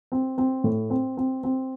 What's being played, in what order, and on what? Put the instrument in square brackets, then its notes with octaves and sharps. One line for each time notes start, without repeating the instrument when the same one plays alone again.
[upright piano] C4
C4
A2
C4
C4
C4